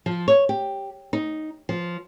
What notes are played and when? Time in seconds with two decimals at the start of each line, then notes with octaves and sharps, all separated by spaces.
0.06 F3
0.28 C#5
0.49 G4
1.13 D#4
1.69 F3